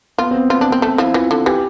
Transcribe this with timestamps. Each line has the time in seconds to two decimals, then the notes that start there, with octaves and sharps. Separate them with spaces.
0.18 B3 F4
0.31 C4
0.35 B3
0.50 B3 F4
0.61 D4
0.71 B3 C4
0.82 A3 C4
0.98 F3 E4
1.14 E3 F4
1.31 D3
1.46 E3 G4